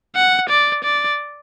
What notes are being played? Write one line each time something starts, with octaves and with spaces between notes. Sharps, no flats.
F#5
D5
D5